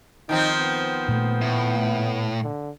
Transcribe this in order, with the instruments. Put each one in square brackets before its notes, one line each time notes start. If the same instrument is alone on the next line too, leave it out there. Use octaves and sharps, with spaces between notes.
[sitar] D#3 F3 C4 [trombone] D#4
[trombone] B3
[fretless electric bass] A#2 A3
[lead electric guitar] A2
[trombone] D3